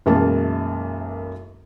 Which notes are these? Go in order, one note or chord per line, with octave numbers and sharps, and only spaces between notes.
B1 F#2 E3 G#3 A#3 A5